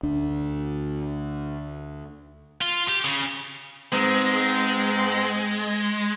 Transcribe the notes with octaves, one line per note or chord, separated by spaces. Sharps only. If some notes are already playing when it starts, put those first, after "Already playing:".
D2 D4
F4
G4
C#3
G#2 G#3 B3 C4